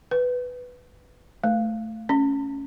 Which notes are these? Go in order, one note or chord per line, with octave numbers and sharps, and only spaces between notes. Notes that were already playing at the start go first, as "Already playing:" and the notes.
B4
A3
C#4